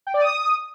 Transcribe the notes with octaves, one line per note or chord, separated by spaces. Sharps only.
G5
D5
D#6